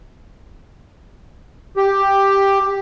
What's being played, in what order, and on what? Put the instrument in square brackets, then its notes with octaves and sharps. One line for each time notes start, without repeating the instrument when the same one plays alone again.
[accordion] G4